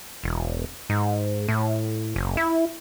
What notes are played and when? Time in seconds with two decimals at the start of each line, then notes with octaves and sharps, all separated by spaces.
0.24 E1
0.89 G#2
1.48 A2
2.16 F#1
2.37 E4